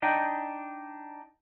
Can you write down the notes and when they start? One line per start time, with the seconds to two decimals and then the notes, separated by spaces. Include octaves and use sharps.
0.02 D4 D#4 D#5 G5